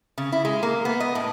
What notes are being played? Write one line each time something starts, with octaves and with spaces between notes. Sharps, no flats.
C#3
E4
G#3
A#3
B3
D#5
A2